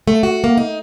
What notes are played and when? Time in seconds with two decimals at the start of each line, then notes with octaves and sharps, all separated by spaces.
0.08 A3
0.23 F#4
0.44 A#3
0.58 D#4